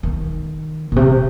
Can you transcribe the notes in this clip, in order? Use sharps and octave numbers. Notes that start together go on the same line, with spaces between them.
D#3
A#2
C3